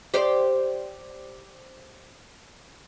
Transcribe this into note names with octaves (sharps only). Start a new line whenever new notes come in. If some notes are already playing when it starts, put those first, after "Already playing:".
G4 C5 D5